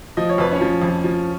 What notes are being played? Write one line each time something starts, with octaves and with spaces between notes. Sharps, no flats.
F3 D#5
C#5
F2 B4
C#4 C#5
F3
F2
F3